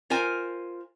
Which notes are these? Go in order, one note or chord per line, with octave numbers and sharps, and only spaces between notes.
F4 A#4 C5 G#5